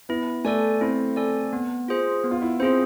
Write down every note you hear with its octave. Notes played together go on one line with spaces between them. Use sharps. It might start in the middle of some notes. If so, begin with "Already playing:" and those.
B3 E4
A3 A4 D5 G#5
C4 E4
A4 D5 G#5
B3
F4 G#4 C5
B3
F4
E4
C4 F4 G#4 C5